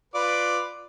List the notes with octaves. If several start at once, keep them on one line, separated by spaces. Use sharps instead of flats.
F4 B4 D5